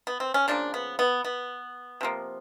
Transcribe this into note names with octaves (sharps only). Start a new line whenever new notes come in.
B3
C4
C#4
C#3 F3 A#3 D4
B3
B3
B3
C3 F3 A#3